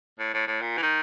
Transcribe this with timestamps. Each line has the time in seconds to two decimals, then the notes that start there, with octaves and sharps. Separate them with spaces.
0.19 A2
0.34 A2
0.47 A2
0.62 A#2
0.78 E3
0.82 D#3